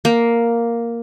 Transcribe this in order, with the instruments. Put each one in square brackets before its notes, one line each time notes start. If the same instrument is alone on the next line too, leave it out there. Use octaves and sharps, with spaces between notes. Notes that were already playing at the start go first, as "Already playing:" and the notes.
[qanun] A#3